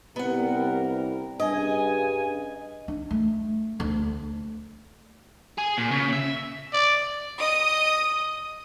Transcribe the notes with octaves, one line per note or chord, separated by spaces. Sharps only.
C2 G3 B3 A#4 F#5
G2 C#3 D#5 G#5
D4
A3
D2
G#4
A#2
C#3
E5
D5
D#5 D#6